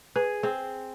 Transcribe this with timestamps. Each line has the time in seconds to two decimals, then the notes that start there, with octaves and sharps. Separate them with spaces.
0.16 G#4 B4
0.43 C4 G#4